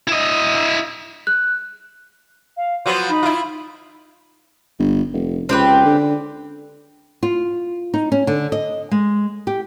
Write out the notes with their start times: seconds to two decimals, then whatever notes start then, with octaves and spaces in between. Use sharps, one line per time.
0.08 E4 D#5
1.27 F#6
2.57 F5
2.86 F3 F#3 B3 C6
3.09 D#4 B5
3.23 E4 F4
4.79 G1
5.13 F1
5.49 C#2 C4 G4 B4
5.85 D3
7.23 F4
7.94 D#4
8.12 C#4
8.27 D3
8.52 D#5
8.91 G#3
9.47 G4